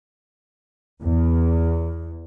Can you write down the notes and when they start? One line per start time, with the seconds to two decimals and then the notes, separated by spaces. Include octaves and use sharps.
1.01 E2